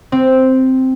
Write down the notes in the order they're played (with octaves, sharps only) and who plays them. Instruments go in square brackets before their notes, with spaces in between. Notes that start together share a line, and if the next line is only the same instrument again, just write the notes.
[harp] C4